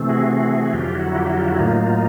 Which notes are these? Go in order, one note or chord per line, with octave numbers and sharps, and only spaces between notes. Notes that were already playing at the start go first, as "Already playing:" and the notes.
Already playing: C3 E3 A3 C4
F#4 G#4
F2 D3 F#3 F4 G4
E4 F#4
F4 G4
E4 F#4
F4 G4
E4 F#4
A2 F#3 A#3 D#4 F4